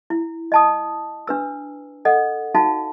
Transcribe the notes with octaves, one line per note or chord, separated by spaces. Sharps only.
E4
D#5 A5 D#6
D4 B4 E6
A4 D#5 F#5
D#4 F#4 F5 A5